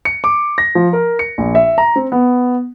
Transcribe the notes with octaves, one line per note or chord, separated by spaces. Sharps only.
C#7
D6
A#6
F3
A#4
C#7
A#1
E5
A#5
C4
B3